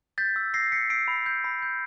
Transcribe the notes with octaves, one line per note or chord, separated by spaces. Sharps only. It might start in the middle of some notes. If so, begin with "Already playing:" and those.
G6 A6 B6
E6
E6 A#6 C7
G6 B6 C#7
E6 C7 D7
B5
G6
B5
G6